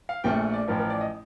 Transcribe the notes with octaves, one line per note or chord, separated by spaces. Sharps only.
F5
A#1 A#2 A3 G5
D5
A1 A2 F3 A#4
A#4
D5
D#5